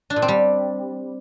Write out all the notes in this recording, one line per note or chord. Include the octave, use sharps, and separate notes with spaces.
D4
A#2
C4
G3